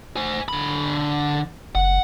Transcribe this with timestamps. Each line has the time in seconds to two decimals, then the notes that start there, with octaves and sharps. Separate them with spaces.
0.16 C5 G#5
0.48 D3 B5
1.75 F#1 F#5